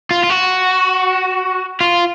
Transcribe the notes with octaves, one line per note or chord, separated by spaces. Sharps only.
F4
F4
F#4
F4